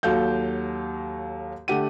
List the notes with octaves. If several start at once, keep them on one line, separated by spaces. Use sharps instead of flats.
D#2 F#3 A4 F5 G6
D3 A3 G4 F#5 D#7